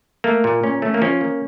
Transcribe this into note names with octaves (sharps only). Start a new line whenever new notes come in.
A3 A#3
A#2
A#2 C#4
A3 C#4
A#3
F3 C#4
A#3